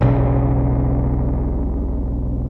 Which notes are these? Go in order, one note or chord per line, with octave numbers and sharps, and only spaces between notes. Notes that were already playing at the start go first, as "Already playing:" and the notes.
E1 B1 C#3